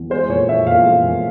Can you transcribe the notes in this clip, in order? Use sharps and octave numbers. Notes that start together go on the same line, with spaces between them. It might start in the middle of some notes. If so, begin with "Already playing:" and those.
Already playing: E2
G#3 C5
A#2 C#5
C#4 E5
A#2 F5
G#3
A#2